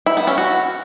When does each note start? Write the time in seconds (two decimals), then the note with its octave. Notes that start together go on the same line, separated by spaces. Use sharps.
0.06 E4
0.17 B3
0.27 C#4
0.38 F#4